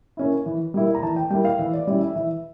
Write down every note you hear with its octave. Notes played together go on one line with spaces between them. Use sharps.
A#3 C#4 E4
E3
G3 A#3 E4
A#5
E3 A5
G5
G3 A#3 E4 G5
F5
E3 E5
D5
G3 C#4 E4 D5
E5
E3 E5